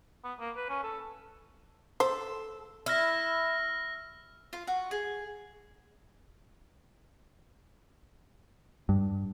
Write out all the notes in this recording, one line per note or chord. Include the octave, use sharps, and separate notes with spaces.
B3
A#3
B4
C#4
A4
A4 C5
E4 E6 F6 A#6
F4
F#4
G#4
G2